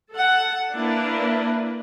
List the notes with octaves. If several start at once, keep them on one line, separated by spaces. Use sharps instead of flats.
A4 F#5
A#3 D4 E4 B4